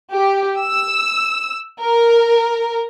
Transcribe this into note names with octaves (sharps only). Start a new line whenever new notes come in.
G4
E6
A#4